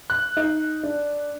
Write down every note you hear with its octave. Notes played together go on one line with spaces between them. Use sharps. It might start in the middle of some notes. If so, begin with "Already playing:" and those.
F#6
D#4
D4